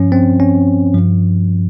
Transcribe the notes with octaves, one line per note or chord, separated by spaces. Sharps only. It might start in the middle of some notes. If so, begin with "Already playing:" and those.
Already playing: G2 F3 C#4
C4
C#4
G2 F3